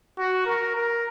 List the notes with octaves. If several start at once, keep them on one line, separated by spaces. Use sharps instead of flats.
F#4
A#4
A#4